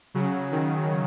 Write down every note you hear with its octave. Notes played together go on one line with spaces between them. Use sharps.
C#3 F#3
D#3